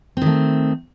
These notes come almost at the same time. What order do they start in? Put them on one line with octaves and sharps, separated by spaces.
C4 D#3 A3